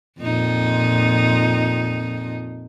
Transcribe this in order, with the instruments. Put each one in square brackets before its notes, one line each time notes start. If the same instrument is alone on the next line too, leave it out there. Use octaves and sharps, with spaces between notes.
[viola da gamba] F2 A#2 D#4